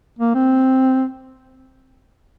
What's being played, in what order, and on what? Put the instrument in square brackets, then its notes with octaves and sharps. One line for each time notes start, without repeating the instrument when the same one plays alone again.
[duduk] A#3
C4